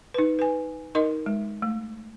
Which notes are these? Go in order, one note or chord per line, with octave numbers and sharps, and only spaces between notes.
D#4 B4
B4 G#5
D#4 A#4 D#5 C6
G#3
A3